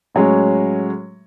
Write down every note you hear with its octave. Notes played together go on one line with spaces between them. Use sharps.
A2 F#3 G#3 C#4